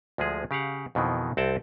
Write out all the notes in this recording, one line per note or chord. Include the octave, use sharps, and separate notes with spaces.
D2 F3 G#3 G#4
C#3 G4 F5 F#5
F2 B2 D#3 E3
C2 C4 F#5 G5 A5